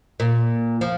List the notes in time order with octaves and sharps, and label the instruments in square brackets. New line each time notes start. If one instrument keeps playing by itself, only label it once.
[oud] A#2
F3